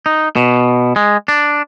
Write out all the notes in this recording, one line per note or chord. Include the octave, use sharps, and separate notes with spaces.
D#4
B2
G#3
D4